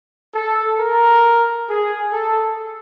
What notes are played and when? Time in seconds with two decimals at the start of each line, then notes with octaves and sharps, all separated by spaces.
0.34 A4
0.79 A#4
1.69 G#4
2.13 A4